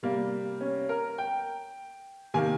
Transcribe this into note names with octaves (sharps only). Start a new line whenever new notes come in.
C3 G3 A#3
C#4
A#4
G5
C3 D#3 A#3 G#5